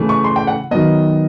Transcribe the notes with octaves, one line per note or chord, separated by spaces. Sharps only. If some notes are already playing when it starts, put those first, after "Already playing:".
Already playing: C#3 E3 A3
C#6
C6
G5
F#5
D#3 F#3 B3 D#5